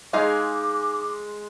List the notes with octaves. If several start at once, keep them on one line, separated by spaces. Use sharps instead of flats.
G#3 D#4 G#4 F5 D6